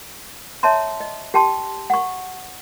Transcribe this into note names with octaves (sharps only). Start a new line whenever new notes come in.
C#5 E5 A5 A#5 C6
D#5
G4 G5 A5 C6
F#5 C#6